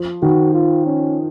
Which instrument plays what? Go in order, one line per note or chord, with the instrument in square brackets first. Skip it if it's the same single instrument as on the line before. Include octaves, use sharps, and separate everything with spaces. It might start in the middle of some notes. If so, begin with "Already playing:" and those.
Already playing: [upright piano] F3
[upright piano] D#3 [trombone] F#4
[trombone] F4
C#4